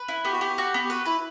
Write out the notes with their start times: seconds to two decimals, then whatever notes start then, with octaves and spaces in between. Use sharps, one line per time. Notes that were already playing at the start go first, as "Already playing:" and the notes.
Already playing: B4
0.08 E4
0.25 B3 G4
0.33 F#4
0.40 B3 G4
0.58 F#4
0.74 B3
0.85 G4
0.90 F#4 B4
1.05 E4 B4